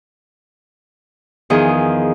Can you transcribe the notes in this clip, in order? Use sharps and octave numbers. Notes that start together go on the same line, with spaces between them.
E2 D#3 F3 G#4